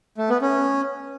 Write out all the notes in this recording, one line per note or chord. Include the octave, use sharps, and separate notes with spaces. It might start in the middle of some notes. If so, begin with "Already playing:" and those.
A3
B3
C#4